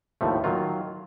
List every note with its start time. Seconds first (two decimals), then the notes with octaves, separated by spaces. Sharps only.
0.21 D#2 A2 F3 A3
0.44 D#3 F#3 F4